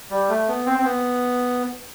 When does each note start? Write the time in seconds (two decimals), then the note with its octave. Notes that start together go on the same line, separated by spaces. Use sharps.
0.11 G3
0.29 A3
0.48 B3
0.66 C4
0.79 C4
0.85 B3